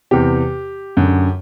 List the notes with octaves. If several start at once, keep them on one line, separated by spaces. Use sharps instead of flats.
E2 C3 E3 G4
F#2 D3